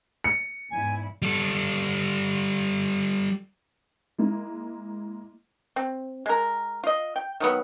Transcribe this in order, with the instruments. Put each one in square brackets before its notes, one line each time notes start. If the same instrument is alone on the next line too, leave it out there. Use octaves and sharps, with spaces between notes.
[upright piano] C#7
[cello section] E2 G#2 E4 [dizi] G#5
[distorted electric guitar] G3 A4
[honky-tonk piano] G#3 A#3 E4
[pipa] C4
G#3 A#4
F4 D#5
G5
D#3 F#3 B3